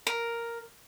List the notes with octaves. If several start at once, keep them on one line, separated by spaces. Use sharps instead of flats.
A#4